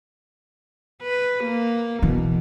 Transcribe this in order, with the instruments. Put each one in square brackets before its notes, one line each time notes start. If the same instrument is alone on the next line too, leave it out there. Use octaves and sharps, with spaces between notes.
[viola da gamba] B4
A#3
[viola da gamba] B2 [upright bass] E3